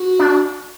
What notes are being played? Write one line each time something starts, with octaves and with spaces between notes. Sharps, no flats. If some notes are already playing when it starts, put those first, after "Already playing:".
Already playing: F#4
D4